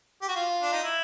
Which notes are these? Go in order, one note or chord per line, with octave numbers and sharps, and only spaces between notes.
G4
F#4
F4
D4
D#4
E4